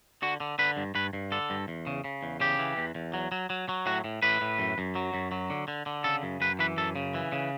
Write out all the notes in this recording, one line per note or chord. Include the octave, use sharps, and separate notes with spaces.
D3 F#4
D3
D3 B4
G2
G2 B4
G2
D3 A4
G2
E2
C#3
C#3
E2
C#3 G4
E3
E2
E2
F#3
F#3
F#3
F#3
A2 F#4
A2
A2 B4
A2
F#2
F#2
F#3
F#2
F#3
D3
D3
D3
C#3 A4
F#2
F#2 B4
E3 B4
F#2 A4
C#3
E3
C#3